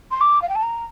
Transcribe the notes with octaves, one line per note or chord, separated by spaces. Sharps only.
C6
D6
F5
G5
A5
A#5